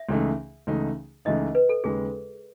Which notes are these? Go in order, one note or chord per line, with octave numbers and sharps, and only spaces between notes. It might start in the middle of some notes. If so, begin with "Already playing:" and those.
Already playing: E5
C#2 C#3 E3 A3 D#4
C#2 C#3 E3 A3 D#4
C#2 C#3 E3 A3 D#4 D#5
B4
A4
D#2 C#3 G#3 G#4